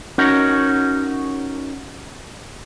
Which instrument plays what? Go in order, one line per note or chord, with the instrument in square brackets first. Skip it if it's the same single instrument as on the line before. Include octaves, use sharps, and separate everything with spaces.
[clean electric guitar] C#4 D#4 F#4 A#4 C#5